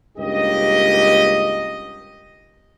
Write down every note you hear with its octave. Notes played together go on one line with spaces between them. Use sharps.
C#2 G2 A#3 D#4 G4 D#5